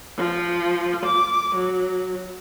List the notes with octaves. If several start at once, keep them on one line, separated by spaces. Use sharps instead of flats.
F3
D6
F#3